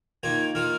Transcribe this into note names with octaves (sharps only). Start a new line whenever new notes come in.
D#3 A#3 F4 G#6
D#3 A#3 F4 F6